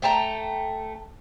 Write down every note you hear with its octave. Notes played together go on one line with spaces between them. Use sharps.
A3 G5 A5 A#5